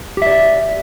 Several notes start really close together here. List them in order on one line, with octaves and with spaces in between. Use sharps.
G4 E5 D5